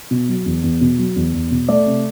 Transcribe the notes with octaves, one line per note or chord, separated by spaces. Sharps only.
B2
F#3
E2
E2
B2
F#3
E2
E2
B2
A3 D5
C3